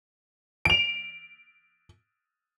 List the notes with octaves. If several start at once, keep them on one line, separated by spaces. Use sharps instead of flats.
D7 F7